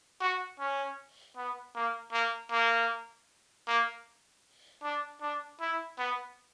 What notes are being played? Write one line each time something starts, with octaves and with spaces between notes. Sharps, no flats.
F#4
C#4
B3
A#3
A#3
A#3
A#3
D4
D4
E4
B3